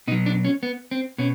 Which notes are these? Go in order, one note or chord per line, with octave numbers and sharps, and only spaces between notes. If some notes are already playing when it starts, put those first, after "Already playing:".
B2 F#3 D#4
D4
C#4
B3
C4
B2 C#4